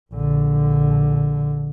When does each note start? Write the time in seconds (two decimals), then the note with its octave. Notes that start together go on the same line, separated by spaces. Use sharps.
0.13 A#1 D3